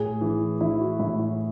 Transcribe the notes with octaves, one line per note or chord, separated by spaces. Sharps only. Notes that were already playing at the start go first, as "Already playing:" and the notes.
Already playing: A2 G#4
E3
E3 E4
F#4
A2 E4
E4